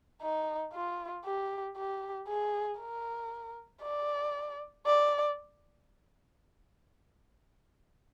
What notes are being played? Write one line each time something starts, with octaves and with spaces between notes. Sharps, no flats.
D#4
F4
G4
G4
G#4
A#4
D5
D5